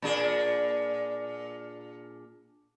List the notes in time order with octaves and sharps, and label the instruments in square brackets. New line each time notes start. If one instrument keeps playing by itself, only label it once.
[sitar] A#2 D4 G#4